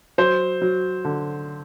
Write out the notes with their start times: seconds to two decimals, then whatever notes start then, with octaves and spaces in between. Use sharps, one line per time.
0.18 F#3 C5
0.62 F#3
1.05 D3